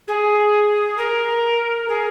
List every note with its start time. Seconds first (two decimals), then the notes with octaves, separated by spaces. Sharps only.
0.07 G#4
0.97 A#4
1.88 G#4